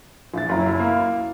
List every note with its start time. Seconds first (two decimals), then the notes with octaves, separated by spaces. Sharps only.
0.34 A#1 E4 A6
0.49 F#1 F#3 E4 A#5
0.80 A#3 F6